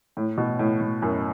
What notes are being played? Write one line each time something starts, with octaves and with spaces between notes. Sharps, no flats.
A2
B2
A2
A2
F#2